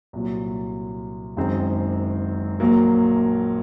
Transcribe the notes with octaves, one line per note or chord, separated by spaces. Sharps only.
C2 A#2 F#3
F#1 F#2 D#3 G#3 C4
A#1 A#2 F#3 A#3